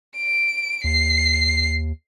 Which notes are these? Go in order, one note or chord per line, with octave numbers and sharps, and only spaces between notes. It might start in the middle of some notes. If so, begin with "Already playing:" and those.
D7
D#2 C7